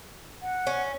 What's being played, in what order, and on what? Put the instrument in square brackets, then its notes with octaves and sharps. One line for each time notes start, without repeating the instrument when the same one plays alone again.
[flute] F#5
[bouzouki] C#4